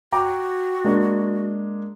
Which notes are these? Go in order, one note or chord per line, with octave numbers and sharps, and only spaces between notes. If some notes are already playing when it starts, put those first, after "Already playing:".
F#4 G5 A#5 D6
G#3 A#3 D4